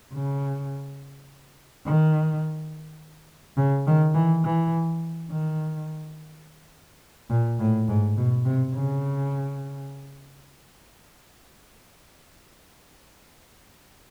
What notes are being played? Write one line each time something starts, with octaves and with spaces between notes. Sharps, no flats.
C#3
D#3
C#3
D#3
E3
E3
D#3
A#2
A2
G#2
B2
C3
C#3